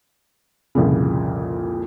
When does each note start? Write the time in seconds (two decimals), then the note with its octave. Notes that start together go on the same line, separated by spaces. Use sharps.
0.75 C2 F2 A#2 C#3